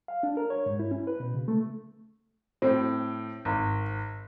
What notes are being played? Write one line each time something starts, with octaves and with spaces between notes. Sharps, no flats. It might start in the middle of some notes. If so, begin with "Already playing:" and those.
F5
D4
A#4
C#5
G#2
E4
C#4
B4
B2
C#3
A3
A2 C4
G#1